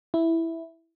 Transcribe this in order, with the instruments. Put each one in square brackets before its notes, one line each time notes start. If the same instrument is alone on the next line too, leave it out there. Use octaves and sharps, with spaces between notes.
[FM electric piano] E4